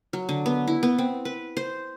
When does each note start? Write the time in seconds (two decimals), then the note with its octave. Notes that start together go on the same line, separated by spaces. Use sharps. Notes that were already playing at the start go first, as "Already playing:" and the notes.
0.13 F#3
0.29 D3
0.46 B3
0.67 E4
0.83 B3
0.98 C4
1.25 B4
1.57 C5